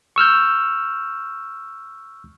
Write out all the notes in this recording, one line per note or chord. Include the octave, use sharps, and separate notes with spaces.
C#6 E6 F6 G6